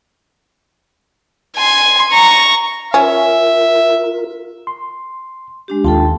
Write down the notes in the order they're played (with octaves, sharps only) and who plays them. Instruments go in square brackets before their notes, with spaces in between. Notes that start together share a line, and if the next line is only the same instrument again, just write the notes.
[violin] G#5 C6
A#5 C#6
[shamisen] C#4 [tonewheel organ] F4 A#4 [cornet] E5
[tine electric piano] C6
[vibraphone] G#3 D4 G4
[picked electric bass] D#2 [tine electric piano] F4 [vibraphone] A4 G5 A5